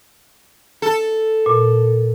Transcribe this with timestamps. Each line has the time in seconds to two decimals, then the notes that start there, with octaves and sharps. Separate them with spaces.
0.82 A4
1.46 A#2